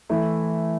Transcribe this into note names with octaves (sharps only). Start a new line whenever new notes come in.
E3 A3 E4